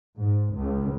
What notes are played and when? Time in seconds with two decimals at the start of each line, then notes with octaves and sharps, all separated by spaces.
0.20 G#2
0.56 C#2